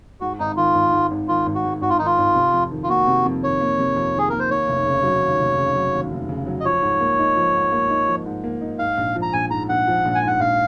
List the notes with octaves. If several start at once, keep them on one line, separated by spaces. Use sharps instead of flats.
G#2 F#4
G#1 D#4
D#3 F4
G#1
G#2
G#1
D#3 F4
G#1
F#4
G#2
G#1 F#4
F4
D#3 D#4
F4
G#1
C3
F2
D#3
F4
A#3 F#4
C3
F2
D#3 C#5
A#3
C3
F2
D#3 G#4
A#3 A#4
C5
D#2 C#5
F1
C#3
F#3
D#2
F1
C#3
F#3
D#2
F1
C#3
F#3
D#5
F3 C#5
G#2
A#3
D#4
F3
G#2
A#3
D#4
F3
G#2
A#3
D#4
G#2 F5
A#1
F3
A#5
A#1 G#5
G#2 A#5
A#1 F#5
F3
A#1
G#5
G#2 F#5
A#1 F5